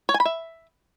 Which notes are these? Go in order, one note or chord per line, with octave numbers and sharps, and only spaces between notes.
C#5
G#5
B5
E5